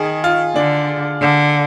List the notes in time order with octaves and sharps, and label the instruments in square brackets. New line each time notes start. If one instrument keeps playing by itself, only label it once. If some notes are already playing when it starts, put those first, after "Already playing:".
Already playing: [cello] D#3 [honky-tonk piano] G#4
[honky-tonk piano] F4
[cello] D3 [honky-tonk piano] D4
[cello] D3